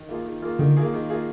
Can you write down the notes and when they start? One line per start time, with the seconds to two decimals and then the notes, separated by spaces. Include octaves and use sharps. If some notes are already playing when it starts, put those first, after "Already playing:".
Already playing: D#3
0.09 A#3 F4 G#4
0.26 D#3
0.42 A#3 F4 G#4
0.59 D3 D#3
0.77 A#3 F4 G#4
0.94 D#3
1.10 A#3 F4 G#4